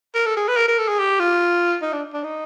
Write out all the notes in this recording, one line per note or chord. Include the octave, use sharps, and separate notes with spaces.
A#4
A4
G#4
B4
A#4
A#4
A4
G#4
G4
F4
D#4
D4
D4
D#4